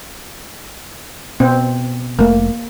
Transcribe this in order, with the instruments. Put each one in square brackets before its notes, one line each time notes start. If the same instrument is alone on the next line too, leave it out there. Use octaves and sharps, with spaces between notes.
[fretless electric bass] B2 [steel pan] C4
[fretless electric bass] F1 A3 [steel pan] A#3